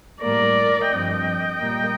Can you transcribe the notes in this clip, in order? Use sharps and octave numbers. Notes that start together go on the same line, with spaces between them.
A2 G3 A#3 A#4 D5
G2 F3 C4 D#5 G5
A#2 G3 A#3